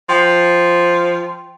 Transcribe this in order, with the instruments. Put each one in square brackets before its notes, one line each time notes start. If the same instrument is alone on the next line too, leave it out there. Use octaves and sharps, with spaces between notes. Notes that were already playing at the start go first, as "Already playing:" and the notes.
[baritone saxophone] F3 [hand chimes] G5 C6